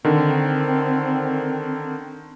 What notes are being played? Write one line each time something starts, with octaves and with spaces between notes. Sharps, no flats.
D3 D#3 C4